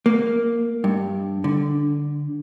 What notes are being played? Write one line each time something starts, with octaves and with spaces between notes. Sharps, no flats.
A#3
G2
D3